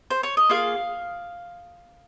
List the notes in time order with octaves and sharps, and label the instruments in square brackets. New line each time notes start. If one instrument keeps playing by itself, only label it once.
[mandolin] C5
C#5
D#5
A#3 F4 G#4 F5